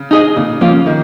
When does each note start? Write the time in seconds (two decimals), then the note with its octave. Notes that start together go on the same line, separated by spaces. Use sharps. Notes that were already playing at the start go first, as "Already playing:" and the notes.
Already playing: C#3
0.11 D#4 G#4 D#5
0.37 A#2 C#3
0.61 F3 A#3 C#4 F4
0.86 D#3